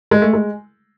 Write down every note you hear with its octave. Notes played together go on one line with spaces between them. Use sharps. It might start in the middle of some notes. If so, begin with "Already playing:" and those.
G#3
A3
G#3